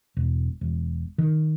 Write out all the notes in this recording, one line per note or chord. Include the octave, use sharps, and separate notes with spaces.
E1
E1
D#3